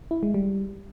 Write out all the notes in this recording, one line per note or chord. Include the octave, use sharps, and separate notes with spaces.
E4
G#3
G3